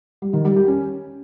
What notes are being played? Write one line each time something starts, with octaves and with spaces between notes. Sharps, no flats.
G3
D#3
G3
G4
C#4